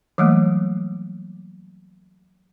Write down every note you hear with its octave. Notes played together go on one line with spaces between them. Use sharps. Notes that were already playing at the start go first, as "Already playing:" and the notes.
E3 F#3 G3 A3 A#3